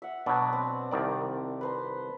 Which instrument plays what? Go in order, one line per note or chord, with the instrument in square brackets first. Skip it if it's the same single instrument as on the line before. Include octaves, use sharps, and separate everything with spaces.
[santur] E5 F#5
[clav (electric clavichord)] B2 F#3 [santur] D4 B4 A5
[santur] C4
[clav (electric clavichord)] C2 D#3 D5
[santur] B4 C5 A#5